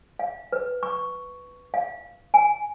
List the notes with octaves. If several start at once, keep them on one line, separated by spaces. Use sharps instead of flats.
F5
B4
C#6
F5
G#5